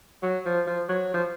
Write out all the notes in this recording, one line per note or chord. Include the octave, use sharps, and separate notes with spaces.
F#3
F3
F3
F#3
F3